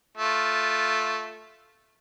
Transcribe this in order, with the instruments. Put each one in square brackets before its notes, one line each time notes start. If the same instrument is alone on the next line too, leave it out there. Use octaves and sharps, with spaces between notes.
[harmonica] A3 F4